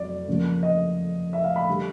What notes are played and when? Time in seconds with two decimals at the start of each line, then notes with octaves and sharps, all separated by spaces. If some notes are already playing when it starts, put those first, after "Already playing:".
Already playing: F2 F#3 D5
0.28 C#3 F3 A#3
0.63 D#5
1.33 E5
1.44 F5
1.56 B5
1.68 D3 G3